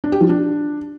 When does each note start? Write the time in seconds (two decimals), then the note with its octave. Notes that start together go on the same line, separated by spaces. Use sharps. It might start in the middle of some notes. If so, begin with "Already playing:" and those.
0.04 D4
0.12 G4
0.21 F3
0.29 D4